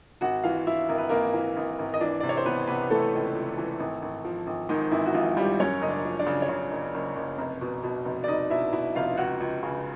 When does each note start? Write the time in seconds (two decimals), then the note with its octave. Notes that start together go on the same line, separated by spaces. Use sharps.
0.21 G#1 F#4 F#5
0.43 E3 F4 F5
0.67 E3 E4 E5
0.89 G#1 A#4
0.98 B4
1.09 G#1 A#3 A#4
1.34 E3
1.57 G#1
1.79 G#1
1.94 D#5
2.00 E3 D4 D5
2.21 C3 D5
2.29 C#5
2.37 C5
2.46 E3 B3 B4
2.68 C3 B3 B4
2.90 E3 A3 A4
3.14 C#2
3.35 C#2
3.58 E3
3.80 G#1
4.02 G#1
4.25 F3
4.47 G#1
4.69 G#2 D#3 D#4
4.92 G#1 E3 E4
5.06 F#4
5.14 G#1 F3 F4
5.37 F3 G3 G4
5.60 F#2 C#4 C#5
5.81 F#1 D#5
5.89 D4 D5
6.05 F3
6.19 D4 D5
6.26 C#3
6.42 C#5
6.49 C#3 D4 D5
6.71 F#1
6.94 F#1
7.16 F#1
7.38 F1
7.61 B2
7.83 B2
8.05 F1
8.24 D5
8.28 F1 D#4 D#5
8.50 B2 E4 E5
8.73 B2 E4 E5
8.95 F1 F4 F5
9.17 C#2 F#4 F#5
9.40 C#2
9.63 C#3